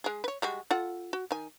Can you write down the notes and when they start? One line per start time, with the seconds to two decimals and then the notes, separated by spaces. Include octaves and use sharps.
0.04 G#3 G#4
0.24 B4 C#5
0.42 G3 G#3 F#4
0.71 F4 A4 F#5
1.13 F#4
1.31 D#3 G#5